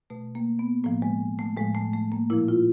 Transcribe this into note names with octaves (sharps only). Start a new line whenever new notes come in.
B2 A3
A#3
B3
A2 F3 A#3
G#3
A3
A2 F3 G#3
A3
A3
A#3
A#2 F3 E4
F4